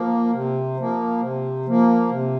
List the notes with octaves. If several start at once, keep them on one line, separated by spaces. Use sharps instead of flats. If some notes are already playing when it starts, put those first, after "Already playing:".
Already playing: F3 A#3
C3
F3 A#3
C3
F3 A#3
C3